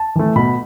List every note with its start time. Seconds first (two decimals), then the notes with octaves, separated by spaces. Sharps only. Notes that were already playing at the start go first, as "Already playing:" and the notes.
Already playing: A5
0.16 E3 A3
0.36 B2 B5